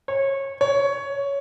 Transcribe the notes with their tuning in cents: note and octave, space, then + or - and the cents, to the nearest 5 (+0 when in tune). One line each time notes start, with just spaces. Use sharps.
C#5 -25
C#5 +10